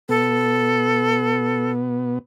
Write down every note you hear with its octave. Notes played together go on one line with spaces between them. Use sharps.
B2 B3 A4